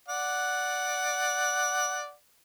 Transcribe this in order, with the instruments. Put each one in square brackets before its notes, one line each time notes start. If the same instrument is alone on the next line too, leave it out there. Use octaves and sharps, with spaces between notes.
[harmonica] D5 F#5